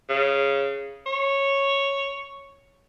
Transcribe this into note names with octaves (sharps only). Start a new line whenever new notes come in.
C#3
C#5